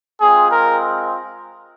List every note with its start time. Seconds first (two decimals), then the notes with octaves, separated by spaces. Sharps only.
0.21 G#3 C4 F4 G#4
0.52 A#4